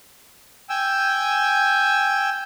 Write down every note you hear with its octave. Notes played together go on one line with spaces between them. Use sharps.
G5 G#5 E6